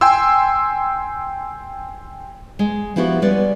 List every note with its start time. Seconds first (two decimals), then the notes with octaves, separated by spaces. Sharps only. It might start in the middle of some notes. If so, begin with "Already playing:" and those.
0.01 G5 G#5 C6 E6
2.59 G#3
2.96 F3 B3 E4 F#4 G4
3.22 G3 G#3 B3 C#4 B4 D5